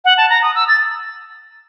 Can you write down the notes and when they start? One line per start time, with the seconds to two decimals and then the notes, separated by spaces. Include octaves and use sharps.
0.05 F#5
0.17 A5
0.30 A#5
0.42 D#6
0.55 E6
0.68 A6